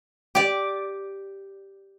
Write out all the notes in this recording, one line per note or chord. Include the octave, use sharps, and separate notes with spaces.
G4 D5